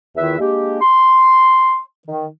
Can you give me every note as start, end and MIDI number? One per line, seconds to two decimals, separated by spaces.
0.16 0.38 40
0.16 0.38 51
0.16 0.38 64
0.16 0.38 65
0.16 0.38 71
0.16 0.38 76
0.40 0.78 56
0.40 0.78 58
0.40 0.78 62
0.40 0.78 67
0.82 1.79 84
2.08 2.26 51